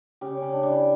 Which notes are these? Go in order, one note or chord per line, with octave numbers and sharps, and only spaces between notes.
C#3 G4
C#4
C#3
D4
C#3 D4
E4